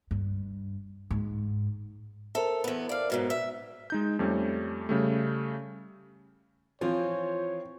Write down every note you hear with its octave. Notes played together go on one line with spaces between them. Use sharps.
G2
G#2
A4 A#4 C5 E5
E2 B3
D5 F5
G#2 B2 F#3
E5
G#3 D#4 G6
F2 G3 A3 C#4
C#3 G3 A3
E3 F3 C4 F4 C#5